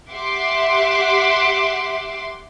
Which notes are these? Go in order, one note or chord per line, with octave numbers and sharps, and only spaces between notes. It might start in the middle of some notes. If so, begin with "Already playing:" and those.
G4 E5 F#5 C6 D6